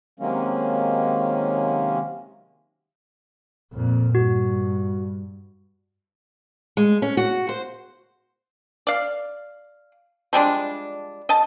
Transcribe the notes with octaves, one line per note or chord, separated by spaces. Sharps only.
C3 D#3 F#3 G#3 A#3 C#4
F2 A#2
G2 F#4
G#3
C#4
F#4
C5
D5 F5
F3 G3 G#3 D4
D#5 A5